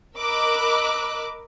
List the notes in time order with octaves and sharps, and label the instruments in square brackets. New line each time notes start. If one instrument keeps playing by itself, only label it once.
[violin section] A#4 D#5 B5 D6 E6 F#6